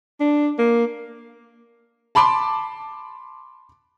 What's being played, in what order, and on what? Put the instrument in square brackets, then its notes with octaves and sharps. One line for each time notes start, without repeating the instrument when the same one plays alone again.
[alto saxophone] D4
A#3
[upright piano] A5 B5 C6 D6